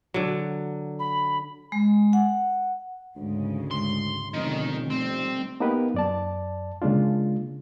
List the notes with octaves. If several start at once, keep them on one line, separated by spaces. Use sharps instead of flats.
D3 F#3
B5
G#3
F#5
D2 G#2 C#3 G#3
C6
F1 B2 D3 D#3 C#4
D#3 G3 A3 C4
A#3 B3 D#4 G4 A#4 B4
F#2 D5 A5
C#3 G#3 A#3 D4 F4